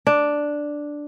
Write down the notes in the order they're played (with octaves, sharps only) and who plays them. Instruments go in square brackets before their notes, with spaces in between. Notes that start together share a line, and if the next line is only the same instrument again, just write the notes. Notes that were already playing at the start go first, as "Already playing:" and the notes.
[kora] D4